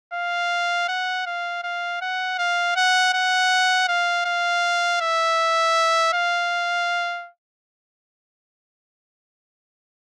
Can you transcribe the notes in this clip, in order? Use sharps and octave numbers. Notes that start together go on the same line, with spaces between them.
F5
F#5
F5
F5
F#5
F5
F#5
F#5
F5
F5
E5
F5